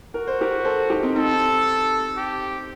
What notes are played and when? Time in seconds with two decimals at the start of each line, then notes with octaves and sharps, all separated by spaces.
0.14 F#4 A#4
0.27 C5
0.41 G4 A#4
0.64 A4 C5
0.90 D#4 G4
1.03 C4 D#4
1.15 C4 D#4 A4
2.17 G4